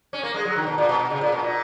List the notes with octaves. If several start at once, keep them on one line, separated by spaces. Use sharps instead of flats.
C#4
A#3
G#3
F#3
D#3
B2
A#2
B2
B2
C#3
A#2
B2
A#2